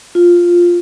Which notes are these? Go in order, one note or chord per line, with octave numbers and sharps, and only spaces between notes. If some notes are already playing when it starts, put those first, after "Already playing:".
F4